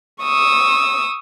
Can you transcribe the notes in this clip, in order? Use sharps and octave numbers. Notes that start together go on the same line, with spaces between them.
C#6 D#6 E6